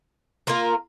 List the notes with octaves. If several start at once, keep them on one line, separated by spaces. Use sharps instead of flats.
A#3 F4 A#4